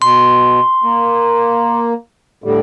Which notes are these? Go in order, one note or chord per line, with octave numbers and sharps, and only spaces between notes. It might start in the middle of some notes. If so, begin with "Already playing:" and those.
B2 C6
A#3
A2 D3 G3